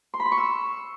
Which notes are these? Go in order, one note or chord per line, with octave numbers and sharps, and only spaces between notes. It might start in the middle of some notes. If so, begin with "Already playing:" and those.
C6
B5
C6
C#6
E6